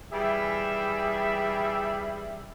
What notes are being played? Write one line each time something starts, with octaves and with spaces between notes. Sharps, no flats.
E3 G3 G#4 E5